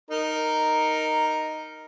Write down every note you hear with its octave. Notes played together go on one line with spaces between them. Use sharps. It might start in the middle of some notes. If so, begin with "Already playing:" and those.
D#4 A#4